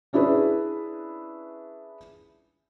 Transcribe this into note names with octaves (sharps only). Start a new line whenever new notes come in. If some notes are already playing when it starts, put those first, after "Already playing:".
C#4 D4 E4 G#4 B4